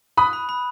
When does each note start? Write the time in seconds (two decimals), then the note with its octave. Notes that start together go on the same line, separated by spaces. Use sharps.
0.17 B5 D#6 F#6
0.33 B5
0.49 B5